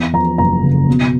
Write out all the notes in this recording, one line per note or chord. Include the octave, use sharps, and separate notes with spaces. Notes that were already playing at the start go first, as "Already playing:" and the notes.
Already playing: E2
F3 A#5
F#1 A#5
C#3
B2